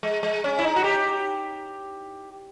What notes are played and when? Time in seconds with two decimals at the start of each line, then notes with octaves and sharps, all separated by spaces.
0.03 G#3
0.23 G#3
0.44 C#4
0.59 E4
0.64 D#4
0.76 F#4
0.84 G4